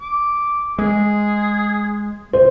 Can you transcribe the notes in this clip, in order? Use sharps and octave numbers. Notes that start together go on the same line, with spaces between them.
D6
G#3 G#4
C5